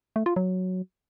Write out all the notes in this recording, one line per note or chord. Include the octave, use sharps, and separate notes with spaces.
A3
F4
F#3